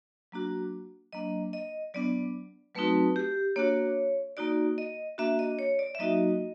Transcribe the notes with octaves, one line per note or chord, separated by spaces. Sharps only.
F#3 A#3 D4 F#4
F#3 A#3 D4 D#5
D#5
F#3 B3 D4 D5
F#3 A3 C4 D#4 F#4 B4
G4
A#3 D4 F#4 C#5
A#3 D#4 F#4 D5
D#5
A#3 D4 F#4 E5
D#5
C#5
D5
E5
F#3 A#3 D#4 F#4 D#5